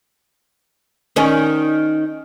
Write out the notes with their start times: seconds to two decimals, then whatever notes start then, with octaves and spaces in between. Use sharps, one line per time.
1.16 D#3 C#4